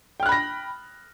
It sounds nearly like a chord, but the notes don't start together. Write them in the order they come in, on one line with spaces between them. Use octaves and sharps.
G5 F6 F#6 B5 A#6